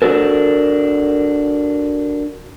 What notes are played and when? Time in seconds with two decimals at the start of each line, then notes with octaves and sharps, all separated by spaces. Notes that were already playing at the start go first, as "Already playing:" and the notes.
0.02 D4 F#4 A4 A#4